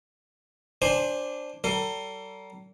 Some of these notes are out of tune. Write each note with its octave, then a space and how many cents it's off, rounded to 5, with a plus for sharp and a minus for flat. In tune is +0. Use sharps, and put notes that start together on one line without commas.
D4 +0 C5 +10 G#5 -20
G3 -40 A4 +35